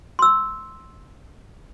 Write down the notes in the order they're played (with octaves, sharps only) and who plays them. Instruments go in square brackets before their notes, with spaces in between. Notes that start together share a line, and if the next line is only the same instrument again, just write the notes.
[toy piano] C6 E6